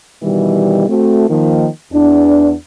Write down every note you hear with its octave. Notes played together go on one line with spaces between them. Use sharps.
B2 D#3 E3 G3
A3 C4 F#4
D#3 F3 A#3
E2 D4